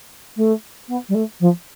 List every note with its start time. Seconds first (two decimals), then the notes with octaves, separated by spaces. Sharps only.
0.36 A3
0.88 B3
1.09 G3
1.15 A3
1.40 F3